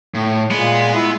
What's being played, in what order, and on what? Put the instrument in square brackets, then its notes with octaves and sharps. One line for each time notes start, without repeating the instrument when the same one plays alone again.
[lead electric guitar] A2
[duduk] A#2 [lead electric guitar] G#3 [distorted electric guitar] B3
[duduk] E4